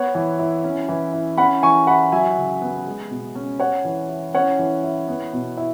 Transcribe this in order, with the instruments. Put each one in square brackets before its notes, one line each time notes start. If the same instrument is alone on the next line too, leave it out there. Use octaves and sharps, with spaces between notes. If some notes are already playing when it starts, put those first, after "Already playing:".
Already playing: [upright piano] B3 [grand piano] C#5 F#5
[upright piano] E3
E4
C#4
E3
E4
[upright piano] C#4 [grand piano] F#5 B5
[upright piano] E3 [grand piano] G#5 C#6
[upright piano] E4 [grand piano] F#5 B5
[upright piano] F#3 [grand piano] E5 G#5
[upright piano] C#3
B3
G#3
B2
C#4
[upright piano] C#4 [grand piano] C#5 F#5
[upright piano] E3
E4
[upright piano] C#4 [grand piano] C#5 F#5
[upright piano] E3
E4
B3
B2
E4